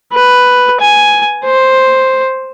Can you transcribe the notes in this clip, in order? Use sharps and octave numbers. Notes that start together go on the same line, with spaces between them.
B4
G#5
C5